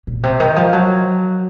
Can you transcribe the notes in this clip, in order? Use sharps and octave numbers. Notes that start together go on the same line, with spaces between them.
A#2
C3
D#3
F3
F#3